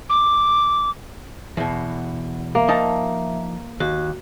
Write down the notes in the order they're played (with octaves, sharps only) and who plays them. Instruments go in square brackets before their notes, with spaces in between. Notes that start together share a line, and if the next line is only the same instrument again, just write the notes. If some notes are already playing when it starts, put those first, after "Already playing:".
[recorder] D6
[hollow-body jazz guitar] E2 B2
[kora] A#3 [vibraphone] E5
[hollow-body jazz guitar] F3 D#4 A5
[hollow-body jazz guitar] D#2 [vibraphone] F#4